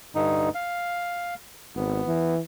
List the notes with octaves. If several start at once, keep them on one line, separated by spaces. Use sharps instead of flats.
G2 D3 D#4
F5
G#1 B3
E3